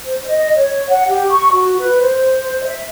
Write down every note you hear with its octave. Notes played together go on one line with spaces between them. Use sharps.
C5
D#5
C#5
F#5
G4
C#6
F#4
B4
C5
E5